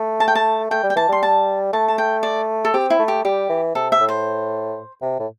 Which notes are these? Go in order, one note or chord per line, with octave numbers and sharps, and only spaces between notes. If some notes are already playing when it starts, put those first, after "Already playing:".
Already playing: A3
A5
G5
A5
A3 G5
G3
G5
E3 A5
G3 C6
A5
A3 A5
A5
G5
D5
A4
C4 G4
E4
A3
G4
G3 G4
E3
C3 A4
E5
A2
C5
C3
A2